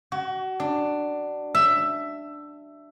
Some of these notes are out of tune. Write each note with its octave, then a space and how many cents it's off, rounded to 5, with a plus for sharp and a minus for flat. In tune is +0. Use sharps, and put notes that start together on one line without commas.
F#4 +30
D4 +10
E5 +10